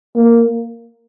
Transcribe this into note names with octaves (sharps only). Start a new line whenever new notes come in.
A#3